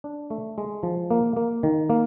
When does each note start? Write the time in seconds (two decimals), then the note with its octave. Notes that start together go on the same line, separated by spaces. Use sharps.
0.04 D4
0.30 A3
0.58 G#3
0.83 F3
1.11 A#3
1.37 A#3
1.63 D#3
1.90 A#3